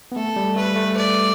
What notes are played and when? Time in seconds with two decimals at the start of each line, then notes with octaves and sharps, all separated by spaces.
0.12 B3
0.16 A3 A4
0.36 G3
0.56 A3 B4
0.76 A3
0.97 D5